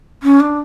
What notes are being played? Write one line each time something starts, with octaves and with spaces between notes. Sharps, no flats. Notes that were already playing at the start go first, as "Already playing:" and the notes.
C#4
D4